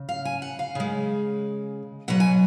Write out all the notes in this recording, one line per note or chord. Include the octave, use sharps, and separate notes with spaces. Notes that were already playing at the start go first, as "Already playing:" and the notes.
Already playing: C#3
F5
G#5
F#5
F5
C#3 G#3
B2 F#3 F#5
G#5